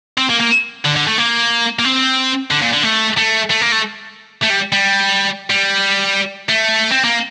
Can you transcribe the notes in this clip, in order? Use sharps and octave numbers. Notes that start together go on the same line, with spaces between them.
C4
A#3
A#3
D3
D3
A3
A#3
A#3
C4
D3
A#2
D3
A3
A3
A3
A#3
A3
A3
G3
G3
G3
A3
C4
A#3